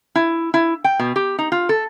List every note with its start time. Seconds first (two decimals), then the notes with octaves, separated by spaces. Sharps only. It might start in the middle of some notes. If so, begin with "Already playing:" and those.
0.16 E4
0.54 E4
0.84 G5
0.99 B2
1.16 G4
1.39 D#4
1.52 F4
1.69 A4